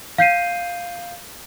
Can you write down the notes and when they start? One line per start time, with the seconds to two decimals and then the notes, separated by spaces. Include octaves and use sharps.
0.18 F5 G6 C7 D#7